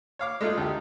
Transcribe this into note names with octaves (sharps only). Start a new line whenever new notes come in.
C#5 F5 D6 F6
G#3 A3 D#4 F4
D2 D#4 G4